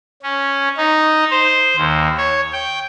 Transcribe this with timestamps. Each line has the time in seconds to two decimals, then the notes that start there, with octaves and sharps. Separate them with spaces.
0.23 C#4
0.78 D#4
1.31 C5
1.77 D#2
2.18 C#5
2.53 G5